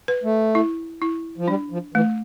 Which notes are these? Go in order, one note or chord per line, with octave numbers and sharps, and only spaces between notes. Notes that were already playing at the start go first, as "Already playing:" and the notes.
B4
A3
E4
E4
F3
G3 D4
F3
E3 A3